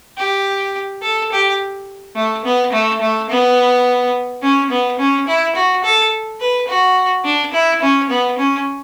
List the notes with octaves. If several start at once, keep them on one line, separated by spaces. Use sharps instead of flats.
G4
A4
G4
A3
B3
A3
A3
B3
C#4
B3
C#4
E4
F#4
A4
B4
F#4
D4
E4
C#4
B3
C#4